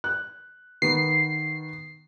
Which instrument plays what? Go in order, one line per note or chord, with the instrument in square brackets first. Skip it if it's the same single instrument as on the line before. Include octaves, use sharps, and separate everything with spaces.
[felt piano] F#6
[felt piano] D#3 B3 [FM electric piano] C7